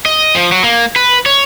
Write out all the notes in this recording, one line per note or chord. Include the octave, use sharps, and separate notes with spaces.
D#5
F3
F#3
A#3
B4
C#5